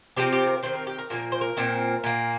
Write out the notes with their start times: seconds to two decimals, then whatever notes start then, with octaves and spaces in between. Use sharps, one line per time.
0.16 C3 F3 C4 G4
0.33 G4
0.47 A#4
0.63 D#3 C4 C5
0.75 A#4
0.87 G4
0.99 A#4
1.10 A#2 F3 A#3 A#4
1.32 C5
1.41 A#4
1.57 A#2 F3 C4
2.04 A#2 A#3